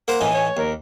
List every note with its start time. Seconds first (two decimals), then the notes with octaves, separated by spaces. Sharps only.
0.08 A#3 A#4 C5 F#5
0.21 A2 E3 D#4 G#5
0.34 C#5
0.57 D#2 A#4